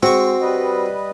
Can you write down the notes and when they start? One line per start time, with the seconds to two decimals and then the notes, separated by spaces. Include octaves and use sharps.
0.03 G#3 C4 F#4 C#6
0.41 G3 B4 D#5